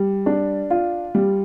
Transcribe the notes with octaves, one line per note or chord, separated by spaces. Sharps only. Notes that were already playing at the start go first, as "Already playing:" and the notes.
Already playing: G3
D4
F4
G3